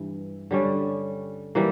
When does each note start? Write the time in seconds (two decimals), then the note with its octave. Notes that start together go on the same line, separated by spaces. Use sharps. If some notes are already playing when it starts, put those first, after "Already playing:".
Already playing: G2 E3
0.51 D3 G3 C#4
1.55 E3 G3 A#3